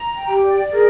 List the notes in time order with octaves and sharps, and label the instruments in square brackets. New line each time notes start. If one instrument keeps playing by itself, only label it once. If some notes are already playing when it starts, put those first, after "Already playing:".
Already playing: [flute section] A#5
G5
[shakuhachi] G4
[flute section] D5
[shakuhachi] G#4 [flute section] A#4